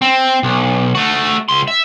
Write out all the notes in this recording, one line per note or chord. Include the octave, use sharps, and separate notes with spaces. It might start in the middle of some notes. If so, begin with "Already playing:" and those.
C4
B1
A3 F#4
C#2 C6
E5